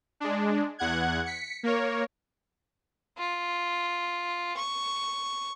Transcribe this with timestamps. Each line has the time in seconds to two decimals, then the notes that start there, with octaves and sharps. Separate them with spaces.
0.20 G#3 D4
0.79 E2 F#5 F#6 G#6
1.25 B6 C#7
1.63 A#3 A#4 C#5
3.18 F4
4.57 C#6